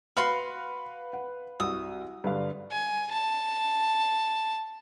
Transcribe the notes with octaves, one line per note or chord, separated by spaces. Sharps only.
F#4 B4 F5 B5 C6 F6
F#5
C2 F#4 D#6 E6
G2 D3 B4 F5
G#5
A5